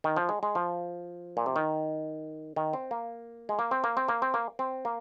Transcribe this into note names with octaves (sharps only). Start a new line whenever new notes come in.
D#3
F3
G#3
G#3
F3
A#2
C3
D#3
D#3
C4
A#3
G#3
A#3
C4
A#3
C4
A#3
C4
A#3
C4
A#3